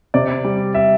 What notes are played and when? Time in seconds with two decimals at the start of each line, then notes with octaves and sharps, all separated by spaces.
0.14 C3 D5
0.44 G3
0.74 E5